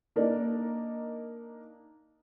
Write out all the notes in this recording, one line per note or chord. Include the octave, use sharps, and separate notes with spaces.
A#3 D4 D#4 A#4